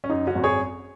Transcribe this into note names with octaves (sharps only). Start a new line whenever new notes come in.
C#4
F#2 D#4
C#4 F#4
G#1
G#4 C#5